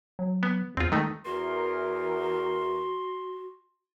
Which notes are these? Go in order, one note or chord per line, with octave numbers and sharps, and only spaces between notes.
F#3
B3
E2 C4 F4
D#3 G#3 A3 D#4
E2 E3 F#4 A#4 C6